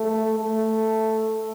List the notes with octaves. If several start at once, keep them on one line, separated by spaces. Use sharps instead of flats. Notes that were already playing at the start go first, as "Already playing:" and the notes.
Already playing: A3
A3